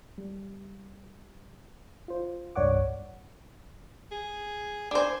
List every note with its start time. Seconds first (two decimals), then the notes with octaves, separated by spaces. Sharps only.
0.18 G3
2.08 F4 C5
2.56 C2 G2 C#5 D5 F#5 D6
4.12 G#4
4.91 D4 C5 G#5